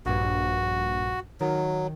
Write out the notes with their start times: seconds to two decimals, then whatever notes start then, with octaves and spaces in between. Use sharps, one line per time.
0.06 A#1 G2 F#4
1.41 D#3 F#3